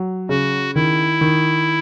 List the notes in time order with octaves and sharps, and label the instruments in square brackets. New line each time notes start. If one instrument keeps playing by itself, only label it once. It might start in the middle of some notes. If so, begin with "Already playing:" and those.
Already playing: [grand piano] F#3
[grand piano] C#3 [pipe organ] F#4
[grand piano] D#3 [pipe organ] E4
[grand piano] D#3